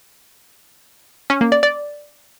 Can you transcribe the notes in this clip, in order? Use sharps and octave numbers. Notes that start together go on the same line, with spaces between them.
C#4
A#3
D5
D5